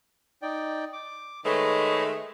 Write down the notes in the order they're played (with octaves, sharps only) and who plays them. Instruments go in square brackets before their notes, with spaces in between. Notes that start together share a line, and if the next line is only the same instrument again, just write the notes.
[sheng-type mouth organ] D#4 D5 G5
D6
[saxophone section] D#3 G#3 A3 [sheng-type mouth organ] B4 C#5 D#5